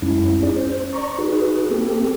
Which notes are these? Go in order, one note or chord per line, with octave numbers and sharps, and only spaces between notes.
F#2 G#3 C#4 E4
C#4 D#4 G#4 D5
C#4 C5
D5 A#5 C#6
D#4 F#4 G#4 B4
A#3 C4 G4 A4